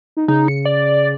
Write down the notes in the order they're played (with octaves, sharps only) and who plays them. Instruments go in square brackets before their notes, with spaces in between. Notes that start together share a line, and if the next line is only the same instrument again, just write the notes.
[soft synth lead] D#4
[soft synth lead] C#3 [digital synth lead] D#4
[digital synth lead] C#7
D5